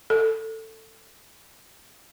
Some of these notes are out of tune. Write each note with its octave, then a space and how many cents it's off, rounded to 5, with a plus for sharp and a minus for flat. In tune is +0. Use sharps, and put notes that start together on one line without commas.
A4 +15